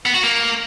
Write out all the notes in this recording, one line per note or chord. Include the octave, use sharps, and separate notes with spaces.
B3
F#4
A#3